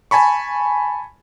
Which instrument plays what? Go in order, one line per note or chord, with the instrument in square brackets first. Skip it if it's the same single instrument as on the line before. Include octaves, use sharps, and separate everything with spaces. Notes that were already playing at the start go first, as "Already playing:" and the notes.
[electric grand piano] G#5 A5 B5 C#6